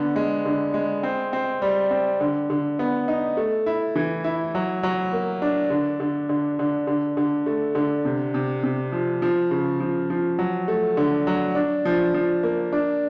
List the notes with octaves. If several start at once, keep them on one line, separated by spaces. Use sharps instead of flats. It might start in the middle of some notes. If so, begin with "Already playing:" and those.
Already playing: D3 B3
G#3
D3
G#3
C4
C4
G3
C4
D3
D3
B3
D#4
A3
E4
E3
E4
F#3
F#3
A#3
D4
D3
D3
D3
D3
D3
D3
A3
D3
C3
C3
C3
F3
F3
C#3
F3
F3
F#3
A3
D3
F#3
D4
F3
F3
A#3
D4